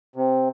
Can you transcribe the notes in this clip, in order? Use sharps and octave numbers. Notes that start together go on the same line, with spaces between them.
C3